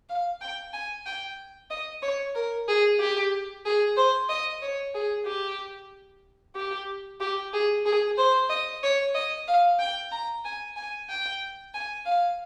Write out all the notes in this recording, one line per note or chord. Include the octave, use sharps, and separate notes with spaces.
F5
G5
G#5
G5
D#5
C#5
A#4
G#4
G4
G#4
C5
D#5
C#5
G#4
G4
G4
G4
G#4
G#4
C5
D#5
C#5
D#5
F5
G5
A#5
G#5
G#5
G5
G#5
F5